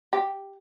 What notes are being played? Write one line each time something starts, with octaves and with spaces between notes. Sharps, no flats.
G4